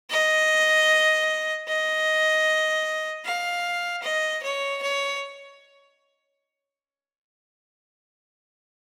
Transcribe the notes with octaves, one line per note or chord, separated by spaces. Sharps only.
D#5
D#5
F5
D#5
C#5
C#5